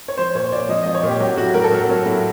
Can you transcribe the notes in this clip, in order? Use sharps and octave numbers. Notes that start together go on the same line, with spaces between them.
C#5
F3 C5
A#2 C#5
A#2 D5
F3 D#5
F3 D#5
C#5
A#2 G4
F#3 G4
A2 F#4
A2 A#4
A4
F#3 A#4
F#3
A2